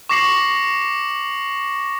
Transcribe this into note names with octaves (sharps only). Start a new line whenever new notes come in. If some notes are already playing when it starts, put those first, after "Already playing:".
C#6 D6 A#6 C7 C#7 F#7